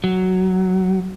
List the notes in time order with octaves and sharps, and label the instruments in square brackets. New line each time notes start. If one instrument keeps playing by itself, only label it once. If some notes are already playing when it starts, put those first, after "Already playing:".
[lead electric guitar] F#3